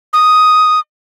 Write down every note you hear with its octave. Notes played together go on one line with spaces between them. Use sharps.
D#6